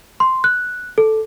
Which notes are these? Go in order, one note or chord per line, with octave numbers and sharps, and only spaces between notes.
C6
F#6
A4